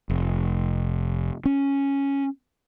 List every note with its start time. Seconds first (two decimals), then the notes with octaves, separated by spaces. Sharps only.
0.10 F1
1.45 C#4